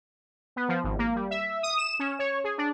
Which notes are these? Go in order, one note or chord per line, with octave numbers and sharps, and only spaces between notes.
B3
F3
G#1
A#3
G3
E5
D#6
E7
C#4
C#5
G#4
D4